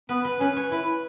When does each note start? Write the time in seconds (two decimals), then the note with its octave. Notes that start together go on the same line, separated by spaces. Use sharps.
0.09 B3 B4
0.25 B4
0.40 C#4 B4
0.56 C#5
0.72 E4 B4